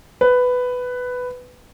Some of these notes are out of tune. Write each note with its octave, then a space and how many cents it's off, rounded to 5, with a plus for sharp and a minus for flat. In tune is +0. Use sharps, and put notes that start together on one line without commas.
B4 +10